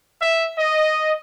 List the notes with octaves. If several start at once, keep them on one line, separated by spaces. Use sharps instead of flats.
E5
D#5